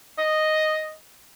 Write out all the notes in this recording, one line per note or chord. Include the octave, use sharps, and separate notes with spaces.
D#5